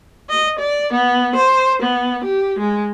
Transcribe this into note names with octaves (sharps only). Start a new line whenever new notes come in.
D#5
D5
B3
C5
B3
G4
G#3